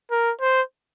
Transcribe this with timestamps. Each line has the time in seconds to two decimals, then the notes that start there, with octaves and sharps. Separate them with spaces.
0.11 A#4
0.41 C5